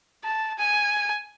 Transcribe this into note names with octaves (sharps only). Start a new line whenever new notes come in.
A5
G#5